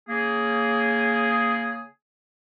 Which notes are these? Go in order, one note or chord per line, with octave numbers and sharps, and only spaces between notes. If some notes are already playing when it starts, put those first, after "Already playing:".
C#3 A#3 G#4